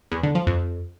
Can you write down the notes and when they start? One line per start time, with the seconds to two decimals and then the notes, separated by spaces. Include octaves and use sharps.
0.11 E2
0.23 D3
0.35 F3
0.47 F2